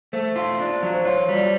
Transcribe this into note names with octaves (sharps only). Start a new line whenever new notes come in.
A3 C5
F4
D4
F#3
C5
F4 C#5
G3
D5